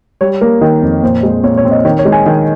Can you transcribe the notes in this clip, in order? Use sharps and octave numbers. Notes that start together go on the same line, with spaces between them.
G3 C#5
A#3 A#4
D#3
F2
A#2 C5
G#3
A#2 C#5
C#5
C4
D#5
D#3 C#5
C#5
G#3
G#5
D#3